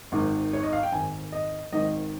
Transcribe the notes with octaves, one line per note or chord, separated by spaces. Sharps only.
G#1 G#2 D#3
C#5
D#5
F5
G5
G#1 G#2 D#3 G#5
D#5
G#1 G#2 D#3 D#5